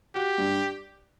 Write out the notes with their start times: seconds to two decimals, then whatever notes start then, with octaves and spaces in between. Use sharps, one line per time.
0.15 F#4 G4
0.38 G2